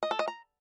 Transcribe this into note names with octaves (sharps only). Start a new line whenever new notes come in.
D#5
A4
D#5
A#5